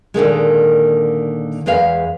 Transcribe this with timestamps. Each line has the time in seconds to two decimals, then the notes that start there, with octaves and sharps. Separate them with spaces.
0.14 A#2 D3 D#3 G#3
1.66 E2 G#3 B4 F5